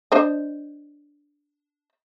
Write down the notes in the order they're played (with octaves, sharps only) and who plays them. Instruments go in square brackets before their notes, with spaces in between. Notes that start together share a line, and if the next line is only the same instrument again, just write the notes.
[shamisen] D4 C5 D#5